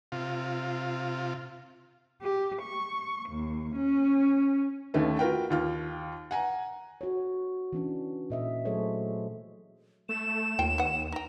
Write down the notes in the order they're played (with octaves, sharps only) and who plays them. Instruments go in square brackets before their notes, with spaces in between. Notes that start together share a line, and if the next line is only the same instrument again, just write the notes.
[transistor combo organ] C3 F4
[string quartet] G4
C#6
D#2
C#4
[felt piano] D#2 D#3 A3 C#4
F4 F#4 A#4 B4 G5
D#2 F4 F6
F#5 G#5 A#5
[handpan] F#4 C#5
E3 C#4 D4
A#2 D#5 E5
F#3 A3 G#4 A4 C5 C#5
[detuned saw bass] A3 [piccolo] E7
[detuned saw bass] D#2 [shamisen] F4 G5 A5
[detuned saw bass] D#2 [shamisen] B3 F#5
[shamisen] D#4 G5 [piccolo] A#5